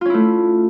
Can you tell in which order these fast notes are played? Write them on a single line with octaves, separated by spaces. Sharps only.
F4 C#4 E4 A3